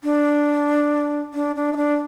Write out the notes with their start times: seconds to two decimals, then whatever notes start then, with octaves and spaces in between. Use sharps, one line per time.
0.04 D4
1.34 D4
1.56 D4
1.73 D#4
1.77 D4